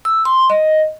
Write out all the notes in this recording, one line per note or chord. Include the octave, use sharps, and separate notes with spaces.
E6
C6
D#5